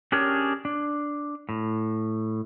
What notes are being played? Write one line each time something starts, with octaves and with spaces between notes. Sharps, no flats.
C#4 D4 G4 G#4 A#4 C#5
D4
A2